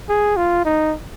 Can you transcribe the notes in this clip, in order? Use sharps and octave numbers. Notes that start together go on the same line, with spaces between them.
G#4
F4
D#4